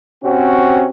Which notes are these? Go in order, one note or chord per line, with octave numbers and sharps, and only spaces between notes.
C3 C4 C#4 F#4